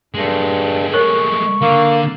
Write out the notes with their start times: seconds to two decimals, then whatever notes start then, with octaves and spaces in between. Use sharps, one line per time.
0.14 G2 G#3 A3
0.94 A#4 C#5 C#6
1.62 D3 A#3